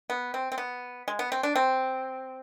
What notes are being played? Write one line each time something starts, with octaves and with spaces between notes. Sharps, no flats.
B3
C4
C4
B3
G#3
B3
C4
D4
C4